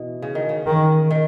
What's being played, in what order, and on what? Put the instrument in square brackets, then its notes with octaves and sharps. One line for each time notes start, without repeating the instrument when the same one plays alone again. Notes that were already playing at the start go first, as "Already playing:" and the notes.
Already playing: [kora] B2 E3
C#3
D#3
C#3
[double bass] D#3
[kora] D#3